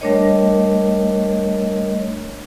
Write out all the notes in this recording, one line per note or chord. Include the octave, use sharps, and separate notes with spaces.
G3 A3 D4 A#4 C#5 D#5